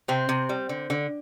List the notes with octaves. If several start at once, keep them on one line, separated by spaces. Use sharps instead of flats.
C3 C4
C3
G3
D3
D3